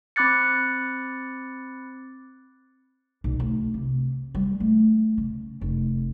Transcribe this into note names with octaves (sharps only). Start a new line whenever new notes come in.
C4 B5 D6 F#6 A6 C#7
B1
D2
C3
G3
A3
C#3
F1